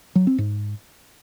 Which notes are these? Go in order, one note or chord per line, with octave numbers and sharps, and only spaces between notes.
F#3
C4
G#2